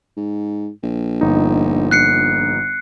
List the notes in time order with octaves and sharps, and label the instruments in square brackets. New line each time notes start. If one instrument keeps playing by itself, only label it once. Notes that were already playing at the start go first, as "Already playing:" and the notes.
[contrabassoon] G#2
A#1
[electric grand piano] G1 D#4
[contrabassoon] A#1 [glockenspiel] F#6 C7 C#7